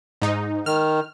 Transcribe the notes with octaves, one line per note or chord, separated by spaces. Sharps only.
G#2 D#4
D#3 F6